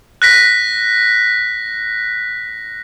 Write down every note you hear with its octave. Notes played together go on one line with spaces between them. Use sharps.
F#6 A#6 B6